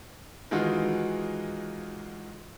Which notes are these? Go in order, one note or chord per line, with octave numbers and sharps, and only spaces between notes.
D#3 E3 G#3 D#4 F4 F#4